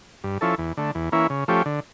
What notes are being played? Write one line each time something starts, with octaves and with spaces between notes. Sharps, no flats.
G2
F3 C#4 E4 A4
E2
D3 A3
E2
E3 A#3 C#4 E4
C#3
F3 A3 C#4 G4
D3